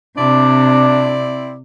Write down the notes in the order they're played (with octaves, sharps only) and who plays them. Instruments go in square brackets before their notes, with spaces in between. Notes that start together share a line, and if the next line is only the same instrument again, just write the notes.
[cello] C3 [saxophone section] C4 E4 D5 [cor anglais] D4